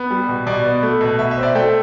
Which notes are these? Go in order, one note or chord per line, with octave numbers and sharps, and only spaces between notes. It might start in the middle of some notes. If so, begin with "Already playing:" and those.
Already playing: B3
G3
B2
B2 D5
B3
A3
B2
B2 E5
E5
C4
D5
A3 G5